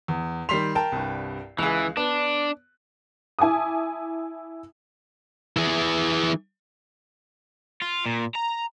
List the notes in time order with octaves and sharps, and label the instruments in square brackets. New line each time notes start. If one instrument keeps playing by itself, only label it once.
[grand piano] E2
[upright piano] D#3 G3 F7 [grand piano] C6 B6 C7
[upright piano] A#4 G5 A5
[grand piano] C2 G2
[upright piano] C#2 C#3 G#4 [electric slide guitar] E3 [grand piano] F#6
[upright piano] B3 [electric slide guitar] D4
[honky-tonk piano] E4 G#5 A5 D6 D#6
[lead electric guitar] E3 G#4
[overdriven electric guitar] F4
A#2
A#5